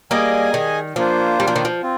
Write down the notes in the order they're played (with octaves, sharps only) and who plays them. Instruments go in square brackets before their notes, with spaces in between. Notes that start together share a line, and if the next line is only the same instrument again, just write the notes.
[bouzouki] G3 A#3 [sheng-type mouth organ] G#4 D#5 G#5
[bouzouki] D#3
[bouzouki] F3 [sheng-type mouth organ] A#3 D4 F4 C5
[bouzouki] G3
F3
D#3
F3
[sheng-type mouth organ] C4 F4